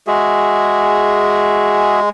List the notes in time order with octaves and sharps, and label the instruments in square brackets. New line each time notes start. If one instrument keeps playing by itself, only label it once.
[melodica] G#3 [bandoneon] F#4 G#4 E5